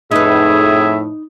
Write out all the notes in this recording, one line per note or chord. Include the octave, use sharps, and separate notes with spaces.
F2 A2 D#4 G#4 B4 E5